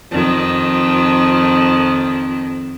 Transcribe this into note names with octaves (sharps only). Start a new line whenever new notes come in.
F2 D#3